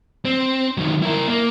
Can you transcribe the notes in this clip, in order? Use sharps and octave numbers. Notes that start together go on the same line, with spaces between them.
C4
D#3 F#3
E4 A#4
A#3